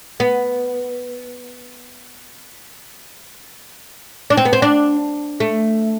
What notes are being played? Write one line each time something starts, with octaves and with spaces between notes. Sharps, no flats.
B3
D4
C4
B3
C4
D4
A3